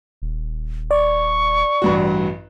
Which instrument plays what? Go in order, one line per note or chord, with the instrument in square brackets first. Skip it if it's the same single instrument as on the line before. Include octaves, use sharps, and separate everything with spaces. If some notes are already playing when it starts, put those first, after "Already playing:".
[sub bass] D#1
[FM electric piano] D5 [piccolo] C#6
[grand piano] A1 G2 F#4